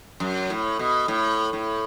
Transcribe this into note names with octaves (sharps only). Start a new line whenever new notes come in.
F#2
A2
B2
A2
A2